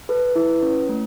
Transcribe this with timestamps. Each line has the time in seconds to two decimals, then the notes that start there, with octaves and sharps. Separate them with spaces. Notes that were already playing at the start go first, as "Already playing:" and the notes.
0.09 A4 B4
0.36 E4
0.63 C#4
0.89 A3